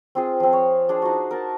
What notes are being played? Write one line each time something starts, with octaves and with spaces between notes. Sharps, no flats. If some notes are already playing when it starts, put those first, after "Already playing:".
C4 F4 G#4
F3 C4
C#5
D4 G#4 C5
D#4 F#4
A#4 F#5 A5